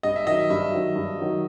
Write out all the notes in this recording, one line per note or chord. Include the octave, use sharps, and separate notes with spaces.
G2 D#5
E5
D#3 F#3 D#5
E5
G2 E5
D#3 F#3
G2
D#3 F#3